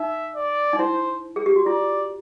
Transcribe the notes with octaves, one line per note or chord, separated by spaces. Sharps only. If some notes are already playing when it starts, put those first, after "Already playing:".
Already playing: D#4 E5
D5
D#4
E4 C5
G#4
G4
F#4
F4 D5